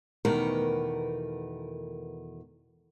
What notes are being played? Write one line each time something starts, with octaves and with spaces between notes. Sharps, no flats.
E2 B2 D#3 A3 A#4 B4